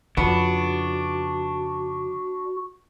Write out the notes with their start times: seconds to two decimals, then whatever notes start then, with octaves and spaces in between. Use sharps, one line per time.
0.17 F2 C#3 B3 D4 F#4